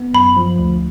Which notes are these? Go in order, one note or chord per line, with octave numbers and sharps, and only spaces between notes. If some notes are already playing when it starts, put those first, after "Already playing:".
Already playing: B3
F#2 B5
F3
D2